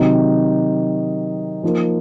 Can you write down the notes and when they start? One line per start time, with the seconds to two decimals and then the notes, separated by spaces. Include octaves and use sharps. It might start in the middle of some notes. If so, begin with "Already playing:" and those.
Already playing: C3 D#3 F#3 C4 D#4
1.64 F3 A#3 D#4 A#4